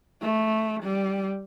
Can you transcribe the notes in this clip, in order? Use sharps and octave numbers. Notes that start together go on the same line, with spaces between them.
A3
G3